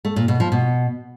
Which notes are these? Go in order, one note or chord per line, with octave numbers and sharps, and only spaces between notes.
A3
A#2
B2
F3
B2